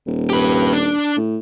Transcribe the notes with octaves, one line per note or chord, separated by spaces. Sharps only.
D#1
G4 B4
D4
A2